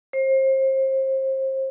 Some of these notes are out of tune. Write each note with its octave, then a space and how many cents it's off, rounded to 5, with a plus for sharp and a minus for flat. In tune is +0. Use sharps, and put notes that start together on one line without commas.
C5 +30